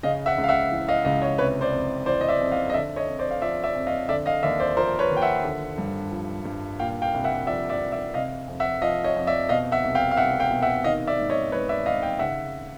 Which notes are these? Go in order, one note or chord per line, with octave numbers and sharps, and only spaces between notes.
C#3 D#5 F5
E5 F#5
C#2
F5
E5 F#5
E3
D#5 F5
C#2 D#5 F5
C#5 D#5
C3 B4 C#5
C5 D5
F2
E3 C5 D5
D#5
D5 E5
F2
D#5 F5
D#5
D3 D5 E5
C#5 D#5
F2
C5 D5
F5
F3 D5 E5
D5 E5
F2
D#5 F5
D3 D5 E5
D#5 F5
D#2 D5 E5
C5 D5
F3 A#4 C5
B4 C#5
D#2
G5
E5 F#5
D3
G2
F3
G2
A#2 F5 G5
F5 G5
C2
E5 F#5
F3 D5 E5
D5 E5
C2
D5 E5
C3 D#5 F5
F2
E5 F#5
F3 D#5 F5
C#5 D#5
F2
D5 E5
B2 D#5 F5
E5 F#5
C2
F5 G5
F5
C2 E5 F#5
F5 G5
B2
E5 F#5
D#3 D#5 F5
D5 E5
G#2
C#5 D#5
G#2 B4 C#5
D5 E5
D#3 D#5 F5
F5 G5
C#3 E5 F#5